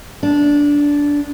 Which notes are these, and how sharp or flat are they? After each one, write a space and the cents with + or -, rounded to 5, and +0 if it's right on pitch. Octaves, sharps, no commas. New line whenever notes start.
D4 -15